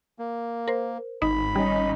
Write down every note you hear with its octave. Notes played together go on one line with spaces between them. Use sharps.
A#3
A#4 C5
G#1 D#4 B5
G3 C#4 D#4